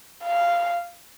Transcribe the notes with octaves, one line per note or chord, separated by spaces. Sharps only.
F5